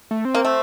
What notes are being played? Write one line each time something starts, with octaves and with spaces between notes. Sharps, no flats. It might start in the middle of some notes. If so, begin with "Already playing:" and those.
A3
C4
A#3
A3